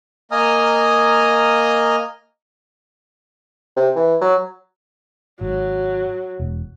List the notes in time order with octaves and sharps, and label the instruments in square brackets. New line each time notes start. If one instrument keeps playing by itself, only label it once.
[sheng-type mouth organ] A#3 D#5 G#5 A#5 D#6 F6
[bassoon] C3
E3
F#3
[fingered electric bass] G#1 [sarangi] F#3
[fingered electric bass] E1